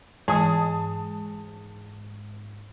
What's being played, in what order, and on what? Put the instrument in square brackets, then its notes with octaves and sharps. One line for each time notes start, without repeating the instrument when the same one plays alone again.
[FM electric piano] G#2 [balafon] E3 D#5 [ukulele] G#4 [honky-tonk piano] A5 D#6